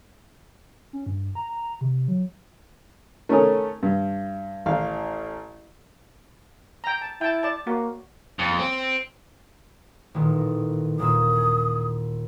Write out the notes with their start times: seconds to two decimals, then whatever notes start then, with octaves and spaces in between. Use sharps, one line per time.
0.93 C#4
1.06 G2
1.35 A#5
1.81 C3
2.08 F#3
3.29 A3 C#4 D#4 A#4 G#5 D#6
3.83 G2
4.66 A1 E3 F5
6.84 G5 A#5
7.01 A5
7.21 E4 G5 A5
7.43 D5 A5
7.67 A#3 F#4
8.39 F2
8.59 C4
10.14 A1 A#2 D#3
10.99 D#1 A#2 D#6 E6